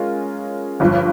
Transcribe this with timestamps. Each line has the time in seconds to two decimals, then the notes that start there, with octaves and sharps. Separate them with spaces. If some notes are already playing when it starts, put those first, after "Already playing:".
Already playing: G#3 C#4 F4 A#4
0.80 G1 G2 F3